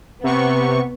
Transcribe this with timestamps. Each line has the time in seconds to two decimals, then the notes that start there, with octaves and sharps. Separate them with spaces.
0.24 C3 B3 C#6